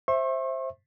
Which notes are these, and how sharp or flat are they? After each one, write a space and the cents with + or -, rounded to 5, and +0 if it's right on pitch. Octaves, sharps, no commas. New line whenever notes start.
C5 +15 E5 +0 C#6 -45